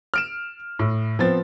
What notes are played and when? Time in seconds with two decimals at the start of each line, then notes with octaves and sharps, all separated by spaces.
0.14 F6 D7 E7
0.79 A2
1.19 F3 B3 C4 A6